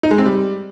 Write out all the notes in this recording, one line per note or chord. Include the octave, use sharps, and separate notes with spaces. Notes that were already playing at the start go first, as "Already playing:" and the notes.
D#4
G#3
C4
G3